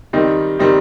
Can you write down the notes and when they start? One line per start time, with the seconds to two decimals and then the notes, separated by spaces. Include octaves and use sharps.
0.13 D#3 G3 C4 D#4
0.59 D#3 G3 C4 D#4